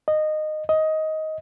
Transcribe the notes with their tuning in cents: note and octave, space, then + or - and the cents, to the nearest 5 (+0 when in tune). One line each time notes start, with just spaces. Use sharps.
D#5 -15
D#5 +15